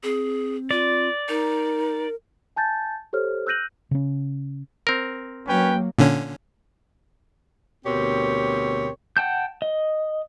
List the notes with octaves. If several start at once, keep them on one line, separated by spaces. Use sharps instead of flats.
C4 G#4
F4 D5
D#4 A#4
G#5 A5 G6 A6
G4 A4 C5 C#5 F6
E6 F#6 G6 A#6 D#7 F#7
C#3 C#4
C4 A#4
F#3 A#3 C#4 B4 G5
A#2 D3 C#4
D2 B2 C4 G4 A#4 C#5
F#5 G5 A5 G6
D#5